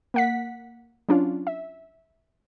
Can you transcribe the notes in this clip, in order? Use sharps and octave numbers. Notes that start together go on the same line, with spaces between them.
A#3 F#5 B6
F#3 C#4 D4 F4
E5